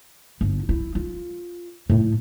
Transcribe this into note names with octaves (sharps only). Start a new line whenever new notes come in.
G1
E4
F4
A2